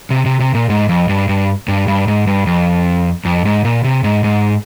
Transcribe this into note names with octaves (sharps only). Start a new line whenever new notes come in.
C3
C3
C3
A#2
G#2
F2
G2
G2
G2
G2
G#2
G2
F2
F2
G#2
A#2
C3
G#2
G#2